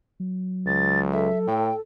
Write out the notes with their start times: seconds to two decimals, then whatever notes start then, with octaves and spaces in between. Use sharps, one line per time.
0.20 F#3
0.66 C#2 A6
1.12 A4 E5
1.47 A2 G5